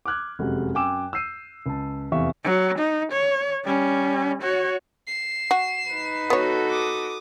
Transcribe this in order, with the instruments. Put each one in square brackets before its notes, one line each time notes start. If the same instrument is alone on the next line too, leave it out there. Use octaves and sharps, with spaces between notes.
[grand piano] D6 F6 F#6 G#6
F1 F#2 G#3 F#4 G4
F#2 G5 G#5 D6 E6 E7
E6 G6 C7 D#7
C#2 A5
F1 E2 G4 E5 F5 C#6
[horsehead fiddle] F#3
D#4
C#5
G3 C#4
F#4 C#5
[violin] C7 E7
[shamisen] F#4
[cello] D#4 B4
[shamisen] B3 C#5 [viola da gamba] F#4 A4
[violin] D6 D#6